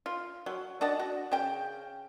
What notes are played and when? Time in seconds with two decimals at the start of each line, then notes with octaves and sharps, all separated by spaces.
0.06 F4
0.46 F#3
0.81 D4 D#5 F#5 A5
0.99 F#4
1.32 C#3 G5